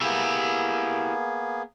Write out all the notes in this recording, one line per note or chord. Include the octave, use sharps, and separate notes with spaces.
A#3 B3 E4 G4 G#4 E5